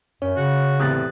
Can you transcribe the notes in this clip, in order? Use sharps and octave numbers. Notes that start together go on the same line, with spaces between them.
F#2 C#4 C#5
C#3 F#4
E2 A2 C3 D#6 F#6 A6